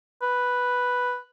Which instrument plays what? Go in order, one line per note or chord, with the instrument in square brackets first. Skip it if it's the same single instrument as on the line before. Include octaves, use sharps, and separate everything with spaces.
[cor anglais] B4